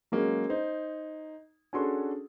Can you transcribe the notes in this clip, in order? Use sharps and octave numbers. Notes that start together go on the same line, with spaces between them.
F#3 G#3 A#3 C#4
D#4 C5
C#4 D4 F#4 G#4 A4 C6